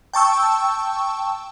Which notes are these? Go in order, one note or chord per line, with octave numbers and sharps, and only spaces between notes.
G5 A5 C#6 E6